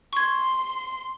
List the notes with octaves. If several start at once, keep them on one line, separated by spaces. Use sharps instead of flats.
C6 C#6 G#6